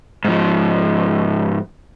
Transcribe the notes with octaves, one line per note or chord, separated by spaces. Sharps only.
G#2 F3